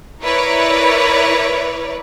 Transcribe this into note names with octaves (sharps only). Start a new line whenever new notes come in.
E4 A#4 B4 C#5 D5